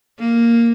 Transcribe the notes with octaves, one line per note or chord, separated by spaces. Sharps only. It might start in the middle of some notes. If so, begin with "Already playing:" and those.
A#3